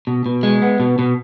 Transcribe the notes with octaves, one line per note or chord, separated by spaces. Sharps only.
B2
B2
G#3
B3
B2
B2